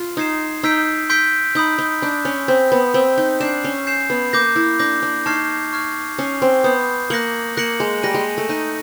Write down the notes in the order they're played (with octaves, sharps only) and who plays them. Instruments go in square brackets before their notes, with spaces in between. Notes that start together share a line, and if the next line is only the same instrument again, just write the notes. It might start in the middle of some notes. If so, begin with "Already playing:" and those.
Already playing: [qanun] F4
[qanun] D#4 [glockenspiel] D#6 G#6 C7 E7
[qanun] D#4 [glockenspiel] C6 E6 G6 B6 D7
[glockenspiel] C6 E6 G6 B6 D7
[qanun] D#4 [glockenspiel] B5 D#6 G6
[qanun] D#4
[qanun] D4 [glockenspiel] B5 D#6 G6
[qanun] C#4
[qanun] C4 [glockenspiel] E6 G6 B6
[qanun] B3
[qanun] C4 [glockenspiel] E6 G6 B6
[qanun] D#4
[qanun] D4 [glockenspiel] G6 C7 E7
[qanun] C#4
[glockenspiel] G6 C7 E7
[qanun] B3
[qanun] A#3 [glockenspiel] D6 G6 A#6
[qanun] E4
[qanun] D4 [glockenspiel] D6 G6 A#6
[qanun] D4
[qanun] D#4 [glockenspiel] A5 C#6 F6 G#6 C7
[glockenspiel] A5 C#6 F6 G#6 C7
[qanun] C#4 [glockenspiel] D#6 G6 C7
[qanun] C4
[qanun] B3 [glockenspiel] D#6 G6 C7
[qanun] A#3 [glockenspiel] F#6 A#6 C#7 F#7
[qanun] A#3 [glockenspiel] F#6 A#6 C#7 F#7
[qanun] G#3
[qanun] G3 [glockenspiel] F#6 A#6 D#7
[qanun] G#3
A3
[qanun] D#4 [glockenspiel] F#6 A#6 D#7